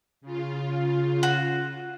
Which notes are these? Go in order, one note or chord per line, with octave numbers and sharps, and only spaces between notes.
C#3 F4
F#4